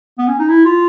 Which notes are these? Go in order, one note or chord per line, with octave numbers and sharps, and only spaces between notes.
B3
C#4
D#4
E4
F4